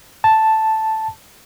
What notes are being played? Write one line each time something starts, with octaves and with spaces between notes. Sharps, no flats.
A5